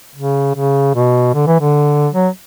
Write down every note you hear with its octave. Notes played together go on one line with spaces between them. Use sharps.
C#3
C#3
B2
D3
E3
D3
F#3